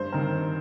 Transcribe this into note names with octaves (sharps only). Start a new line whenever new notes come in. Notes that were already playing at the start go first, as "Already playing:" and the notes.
Already playing: G2 C5
D#3 C4 A#4